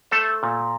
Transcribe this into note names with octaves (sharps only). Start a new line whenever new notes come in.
A3 A4 C5
A#2